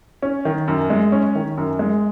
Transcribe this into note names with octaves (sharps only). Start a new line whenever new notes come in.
C#4
D#3
F#2
G#3
C#4
D#3
F#2
G#3